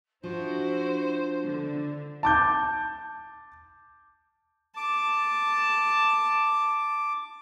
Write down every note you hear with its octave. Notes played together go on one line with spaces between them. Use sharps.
F3 D4 E4 F#4 C5
D3
A5 D6 G6
A5 D6